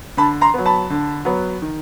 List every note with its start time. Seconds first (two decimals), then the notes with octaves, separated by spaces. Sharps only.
0.17 D3 A5 B5
0.41 A#5 C6
0.54 F#3 B3
0.66 A5 B5
0.90 D3
1.25 F#3 B3
1.62 D#3